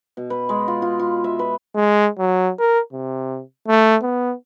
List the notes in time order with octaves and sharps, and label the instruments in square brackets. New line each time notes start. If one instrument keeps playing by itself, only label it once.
[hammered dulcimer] B2
B4
G#3
F4
F4
F4
E5
B4
[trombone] G#3
F#3
A#4
C3
A3
B3